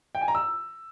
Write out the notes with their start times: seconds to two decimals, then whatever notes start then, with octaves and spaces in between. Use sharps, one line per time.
0.15 G5
0.21 G#5
0.28 A#5
0.35 E6